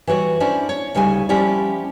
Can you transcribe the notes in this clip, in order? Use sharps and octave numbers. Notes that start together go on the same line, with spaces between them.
E3 G3 F#4 C#5
C#4 D4 E4 C5 D5
C#5
D2 C#3 G3 D#4 G5 G#5
F3 G3 C#4 E4 G4 D5